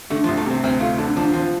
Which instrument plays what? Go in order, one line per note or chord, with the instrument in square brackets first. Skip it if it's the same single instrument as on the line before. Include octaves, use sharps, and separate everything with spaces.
[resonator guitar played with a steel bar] D3 [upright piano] A3
[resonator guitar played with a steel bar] F3
[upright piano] C2
[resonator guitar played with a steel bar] A3
[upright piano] C3 [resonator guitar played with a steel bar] C4
[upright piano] D2 [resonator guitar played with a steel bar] C4
[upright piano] A3 [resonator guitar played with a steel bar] F4
[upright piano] D3 [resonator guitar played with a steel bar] D4
[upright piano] F3 [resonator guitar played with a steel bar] D4
[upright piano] F3 [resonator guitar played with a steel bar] C4